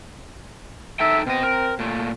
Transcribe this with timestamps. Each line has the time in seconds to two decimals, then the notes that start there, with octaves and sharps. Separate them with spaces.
1.00 D#4 A4 E5 G5
1.27 B2 C4 D#5
1.43 A#4
1.79 A#2 A3